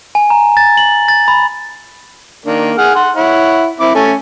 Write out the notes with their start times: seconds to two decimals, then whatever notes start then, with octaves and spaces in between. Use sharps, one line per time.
0.15 G#5
0.30 A#5
0.57 A6
0.77 F#7
1.08 A6
1.28 B5
2.46 D#3 A#3 D4
2.78 G#4 F#5 F6
2.95 F#5 C6
3.16 E4 C#5 F#5
3.80 C4 E4 D6
3.95 A3 C#4 A4